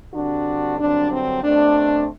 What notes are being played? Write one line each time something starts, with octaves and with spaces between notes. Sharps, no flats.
G2 D3 G3 C4 D4 F#4
G2 D3 F#3 C4 D4
C4
B2 A3 C4 D4